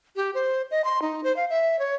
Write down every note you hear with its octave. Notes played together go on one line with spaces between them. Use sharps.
G4
C5
D#5
C6
D#4
C5
F5
E5
C#5